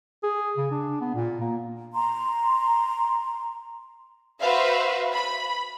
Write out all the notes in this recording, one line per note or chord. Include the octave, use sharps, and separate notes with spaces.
G#4
C#3
D4
B3
A#2
A#3
A#5 C6
F#4 B4 C5 E5 F5
B5